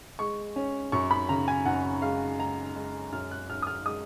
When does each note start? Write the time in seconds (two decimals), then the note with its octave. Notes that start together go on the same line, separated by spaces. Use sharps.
0.19 G#3 C#6
0.56 C#4
0.92 F#2 C#6
1.11 B5
1.29 C#3 A#5
1.48 G#5
1.65 F#2 F#5
2.02 G#3 F5
2.39 G#3 A#5
2.76 G#3
3.12 F#2 F6
3.31 F#6
3.49 F#2 F6
3.62 D#6
3.67 F6
3.85 G#3 D#6